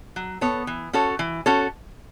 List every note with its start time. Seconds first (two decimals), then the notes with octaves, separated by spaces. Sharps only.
0.16 F#3
0.41 B3 A4 C#5
0.67 E3
0.93 C#4 F#4 A4 C#5
1.19 E3
1.46 C#4 F#4 A4 C#5